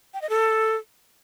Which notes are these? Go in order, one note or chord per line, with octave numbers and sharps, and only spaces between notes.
G5
D#5
A4